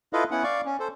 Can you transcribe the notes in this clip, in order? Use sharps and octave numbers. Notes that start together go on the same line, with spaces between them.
E4 F4 A4 B4 D#5 F5
B3 C#4 E4 F#5
D5 F5 C#6
C#4
A4 C5